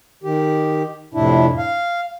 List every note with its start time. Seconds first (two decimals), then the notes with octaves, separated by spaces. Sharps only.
0.24 D#3 G4
1.14 F2 A2 C3 D4 E4
1.58 F5